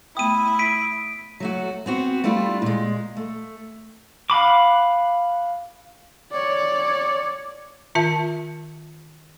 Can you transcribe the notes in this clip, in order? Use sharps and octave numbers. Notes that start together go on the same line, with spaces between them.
A3 B3 E4 G5 D#6 D#7
B6 D7 D#7
F#3 A3 F#4
B3 C4 F#4
G3 A3 D4 E4 F4
A#2 G#3
A3
F5 F#5 B5 D6
C#5 D5
D#3 F4 E5 A5